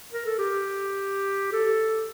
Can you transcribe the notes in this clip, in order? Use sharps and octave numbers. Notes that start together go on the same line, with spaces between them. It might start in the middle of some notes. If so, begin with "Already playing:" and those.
A#4
A4
G4
A4